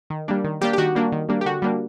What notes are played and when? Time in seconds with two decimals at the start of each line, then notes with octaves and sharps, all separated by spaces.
0.10 D#3
0.28 G3 A#3 D4
0.44 D#3
0.61 G3 A#3 D4 G4
0.73 G4
0.78 D#3 F#4
0.95 G3 A#3 D4
1.12 D#3
1.29 G3 A#3 D4
1.41 G4
1.46 D3 F#4
1.62 G3 A#3 D4